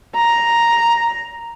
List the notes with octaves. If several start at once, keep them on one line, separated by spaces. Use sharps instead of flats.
A#5